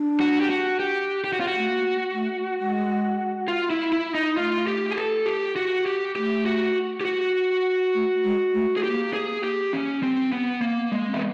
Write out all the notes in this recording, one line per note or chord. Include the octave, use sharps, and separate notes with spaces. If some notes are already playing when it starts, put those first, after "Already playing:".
Already playing: D4
F#4
G4
F#4
G4
G4
F#4
F4
F#4
A3
A#3
A3
G#3
F4
E4
E4
D#4
A3 F4
G4
G#4
A4
G4
F#4
G4
A3 G4
F#4
G4
F#4
A3
G#3
A3
G#4
A#3 G4
G#4
G4
C#4
C4
B3
A#3 B3
G#3
C4
B3